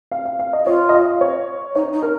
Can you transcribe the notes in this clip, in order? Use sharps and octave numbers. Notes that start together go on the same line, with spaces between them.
F5
F5
F5
D#5
F4 C#5
D#5
F5
C#5
D#4 C#5
D#4
A#4